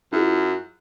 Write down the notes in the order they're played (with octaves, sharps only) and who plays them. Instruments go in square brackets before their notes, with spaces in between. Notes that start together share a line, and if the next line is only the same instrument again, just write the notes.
[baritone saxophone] F#2 [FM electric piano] E4 F4 G#4